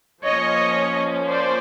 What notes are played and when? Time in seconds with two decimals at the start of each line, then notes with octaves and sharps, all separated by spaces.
0.24 F3 A#3 C#4 C#5 D#5
1.30 C5 D5